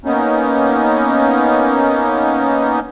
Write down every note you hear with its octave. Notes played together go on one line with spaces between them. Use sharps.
A#3 B3 C#4 D#4